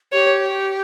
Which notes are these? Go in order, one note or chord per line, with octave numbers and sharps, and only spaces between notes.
G4 C#5